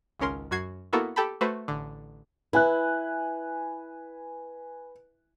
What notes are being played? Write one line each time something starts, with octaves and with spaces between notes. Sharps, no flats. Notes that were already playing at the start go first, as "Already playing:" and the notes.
G#1 C#2 C#4 A#4 C6
F#2 F#4 G#6 C7
A#3 B3 E4 F#4 A4 A#4
G4 A4 G5 A5 B5
A3 F#4 B4 C5
A1 D3
E4 B4 G#5 F#6